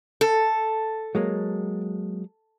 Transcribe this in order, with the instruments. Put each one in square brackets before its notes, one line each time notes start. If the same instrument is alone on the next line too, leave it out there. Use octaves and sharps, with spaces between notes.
[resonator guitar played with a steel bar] A4
[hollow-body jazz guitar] F#3 G#3 A#3